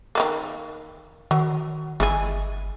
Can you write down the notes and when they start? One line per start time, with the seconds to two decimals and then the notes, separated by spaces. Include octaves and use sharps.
0.15 D#3 G3 A#3
1.31 D#3 F#3
2.00 G1 G#3 E4 G#4